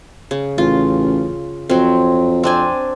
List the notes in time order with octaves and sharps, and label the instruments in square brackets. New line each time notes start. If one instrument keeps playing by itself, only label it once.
[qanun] C#3
[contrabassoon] A1 [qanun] F4
[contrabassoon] F2 [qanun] F#3 C4
[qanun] C4 D4 G#5